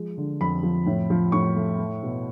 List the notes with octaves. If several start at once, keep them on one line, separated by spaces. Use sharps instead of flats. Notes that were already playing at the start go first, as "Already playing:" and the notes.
Already playing: F3 G#3
D3
F2 B5
F3
A2
F3
A2 C#6
A3
A3
B2